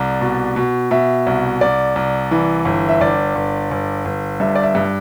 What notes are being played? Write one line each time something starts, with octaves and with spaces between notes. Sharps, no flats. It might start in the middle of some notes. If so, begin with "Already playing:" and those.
Already playing: C2 D5
B2
B2
B2 E5
C2
C2 D5
C2
E3
G1
E5
G1 D5
G1
G1
G1
G2 E5
D5
E5
G2